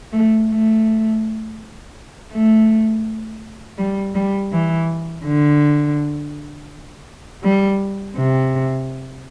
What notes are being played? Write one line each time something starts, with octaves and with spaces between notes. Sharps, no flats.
A3
A3
A3
G3
G3
E3
D3
G3
C3